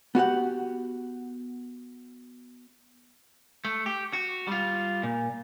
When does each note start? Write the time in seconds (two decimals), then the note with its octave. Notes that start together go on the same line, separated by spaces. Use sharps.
0.15 B3 F#4 G4 F#5
3.65 A3
3.86 G4
4.13 F#4
4.47 G3 F4
5.03 A#2